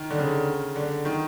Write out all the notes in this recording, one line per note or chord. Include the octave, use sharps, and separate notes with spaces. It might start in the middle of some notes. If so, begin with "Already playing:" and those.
Already playing: D#3
D3
C#3
D3
D#3